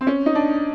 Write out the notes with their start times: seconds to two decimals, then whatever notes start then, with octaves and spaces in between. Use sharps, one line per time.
0.01 C4
0.07 C#4
0.26 D#4
0.35 D4